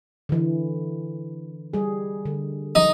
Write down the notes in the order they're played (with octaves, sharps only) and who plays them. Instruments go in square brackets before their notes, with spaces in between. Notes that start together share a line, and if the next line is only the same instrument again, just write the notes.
[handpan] D3 E3
G3 G#4
D3
[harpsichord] D#4